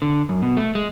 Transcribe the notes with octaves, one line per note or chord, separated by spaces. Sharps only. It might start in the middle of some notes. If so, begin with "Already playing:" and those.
D3
F#2
B2
A3
G#3